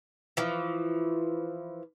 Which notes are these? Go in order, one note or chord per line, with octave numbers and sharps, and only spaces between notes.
E3 F3